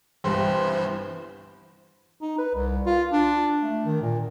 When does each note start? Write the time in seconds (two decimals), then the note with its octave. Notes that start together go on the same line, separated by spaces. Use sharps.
0.24 G1 C2 G2 E3 E4 C5 G5 C6
2.21 D#4
2.38 B4
2.55 C2
2.86 F4
3.11 D4
3.62 A3
3.85 D#3
4.02 A#2